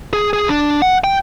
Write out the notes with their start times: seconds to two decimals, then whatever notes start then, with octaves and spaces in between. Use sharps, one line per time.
0.13 G#4
0.33 G#4
0.49 D4
0.82 F#5
1.04 G5